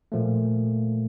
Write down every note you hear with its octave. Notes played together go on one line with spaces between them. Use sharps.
A#2 F3 A3